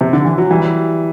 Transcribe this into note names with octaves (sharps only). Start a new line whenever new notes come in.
C3
D3
E3
F#3
E3 G3